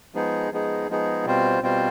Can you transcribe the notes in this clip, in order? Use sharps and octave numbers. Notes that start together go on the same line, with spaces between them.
F3 G#3 B3 D#4 G#4
F3 G#3 B3 D#4 G#4
F3 G#3 B3 D#4 G#4
B2 G3 C4 F4 C5
B2 G3 C4 F4 C5